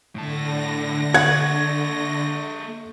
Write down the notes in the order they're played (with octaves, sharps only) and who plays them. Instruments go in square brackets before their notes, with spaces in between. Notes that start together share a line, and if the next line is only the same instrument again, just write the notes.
[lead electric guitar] A2 A5 [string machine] D3 A#6
[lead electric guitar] A#3 A4 [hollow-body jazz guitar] F#5 [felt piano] G#6